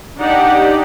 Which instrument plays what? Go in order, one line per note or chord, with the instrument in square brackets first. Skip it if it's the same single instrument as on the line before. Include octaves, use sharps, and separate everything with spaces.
[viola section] D4 D5 F#5 [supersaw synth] D#4 G4